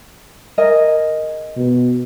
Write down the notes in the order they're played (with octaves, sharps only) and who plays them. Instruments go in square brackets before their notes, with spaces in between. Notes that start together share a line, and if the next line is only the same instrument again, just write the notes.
[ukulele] G#4 A#4 D#5
[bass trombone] B2